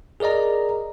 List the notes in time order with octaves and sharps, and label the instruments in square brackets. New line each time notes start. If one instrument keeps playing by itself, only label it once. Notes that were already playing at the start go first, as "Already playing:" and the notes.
[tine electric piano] G#4 A#4 D5 D#5 A#5